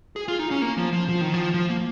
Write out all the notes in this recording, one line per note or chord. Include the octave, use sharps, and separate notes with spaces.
G#4
F4
D#4
C#4
A#3
F3
F3
F3
D#3
F3
F3
A#3